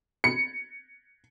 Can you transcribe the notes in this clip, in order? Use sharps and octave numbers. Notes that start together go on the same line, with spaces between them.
C#7